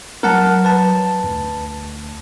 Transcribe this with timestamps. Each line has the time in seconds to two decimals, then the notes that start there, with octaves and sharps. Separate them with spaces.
0.23 F#3 A#4 F#5 A5
0.64 B4 A5
1.24 D2